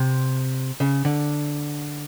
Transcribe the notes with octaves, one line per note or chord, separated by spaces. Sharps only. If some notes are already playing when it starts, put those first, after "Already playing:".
Already playing: C3
C#3
D3